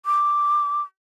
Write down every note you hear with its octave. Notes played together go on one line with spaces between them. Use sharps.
D6